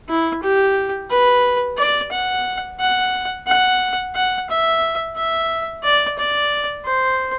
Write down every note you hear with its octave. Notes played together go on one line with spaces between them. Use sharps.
E4
G4
B4
D5
F#5
F#5
F#5
F#5
E5
E5
D5
D5
C5